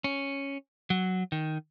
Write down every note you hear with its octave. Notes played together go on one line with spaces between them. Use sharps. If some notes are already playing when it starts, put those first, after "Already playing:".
C#4
F#3
D#3